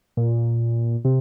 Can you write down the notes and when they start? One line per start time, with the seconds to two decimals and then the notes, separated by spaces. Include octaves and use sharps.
0.17 A#2
1.05 C3